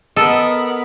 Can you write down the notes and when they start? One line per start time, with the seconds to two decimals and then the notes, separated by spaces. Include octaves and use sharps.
0.16 B3 A4 A#4 D#5